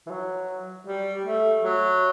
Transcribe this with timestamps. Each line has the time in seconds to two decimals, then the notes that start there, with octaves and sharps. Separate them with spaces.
0.06 E3
0.10 F#3
0.87 G3
1.25 A3
1.63 F#3